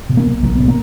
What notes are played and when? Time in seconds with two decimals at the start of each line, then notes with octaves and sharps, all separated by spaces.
0.09 B2
0.17 A#3
0.25 B1
0.43 B1 A#3
0.55 B2 B3
0.68 A#3